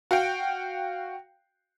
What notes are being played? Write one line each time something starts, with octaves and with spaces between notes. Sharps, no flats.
F#4 F5 G5